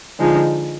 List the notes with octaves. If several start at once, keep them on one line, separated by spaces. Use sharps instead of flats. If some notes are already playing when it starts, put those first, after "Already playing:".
D3 F3 G#3 D#4